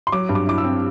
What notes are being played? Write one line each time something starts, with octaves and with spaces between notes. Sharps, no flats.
C6
F#3 D6
G2
D6
E4 D6
E6
C4